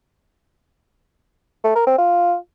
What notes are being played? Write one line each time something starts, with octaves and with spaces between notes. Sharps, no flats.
A3
A#4
C4
F4